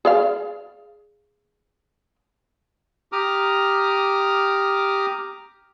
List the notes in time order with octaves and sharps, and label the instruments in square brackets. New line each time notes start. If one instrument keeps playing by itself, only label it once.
[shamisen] G#4 D5 F5
[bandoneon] G4 A#5 D6 D#6 F6